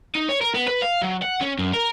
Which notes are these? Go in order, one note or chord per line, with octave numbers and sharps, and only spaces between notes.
D#4
C#5
A#4
B3
B4
F5
F#3
F#5
C#4
F#2
A#4